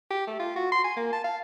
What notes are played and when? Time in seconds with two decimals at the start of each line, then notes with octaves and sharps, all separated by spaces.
0.10 G4
0.27 A3
0.39 F4
0.56 F#4
0.72 C6
0.84 G#5
0.96 A#3
1.12 A5
1.24 F5